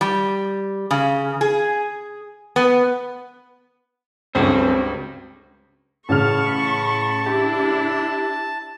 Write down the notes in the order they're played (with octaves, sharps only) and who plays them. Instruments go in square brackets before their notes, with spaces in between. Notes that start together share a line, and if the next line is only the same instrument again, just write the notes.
[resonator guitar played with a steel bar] G3
C#3
G#4
B3
[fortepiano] C#2 G2 [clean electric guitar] F#3 C4
[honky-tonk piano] A1 C#3 F6 [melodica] A5 [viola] B5 C#6
[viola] D4 E4 [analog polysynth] G4